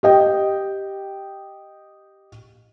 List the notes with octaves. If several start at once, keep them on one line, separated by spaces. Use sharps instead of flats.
G4 D#5 G5